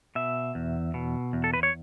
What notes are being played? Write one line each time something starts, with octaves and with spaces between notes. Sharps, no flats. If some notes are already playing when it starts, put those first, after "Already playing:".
B2 E5
E2
B2
E2
A4
B4
C#5